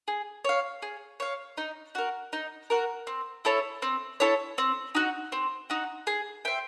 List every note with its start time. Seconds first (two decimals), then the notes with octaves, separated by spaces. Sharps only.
0.08 G#4
0.45 C#5 F5
0.82 G#4
1.20 C#5 F5
1.57 D#4
1.95 F#4 A#4
2.33 D#4
2.70 F#4 A#4
3.07 C4
3.45 E4 A4 C#5
3.82 C4
4.20 E4 A4 C#5
4.58 C4
4.95 D#4 F#4
5.32 C4
5.70 D#4 F#4
6.07 G#4
6.45 C5 E5 G5